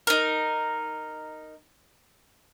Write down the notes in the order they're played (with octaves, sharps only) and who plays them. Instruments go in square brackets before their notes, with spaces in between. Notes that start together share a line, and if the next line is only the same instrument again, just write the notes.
[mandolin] D#4 A#4